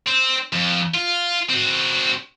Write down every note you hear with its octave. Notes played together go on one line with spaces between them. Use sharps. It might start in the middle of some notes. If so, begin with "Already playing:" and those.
C4
F2
F4
C4 F#4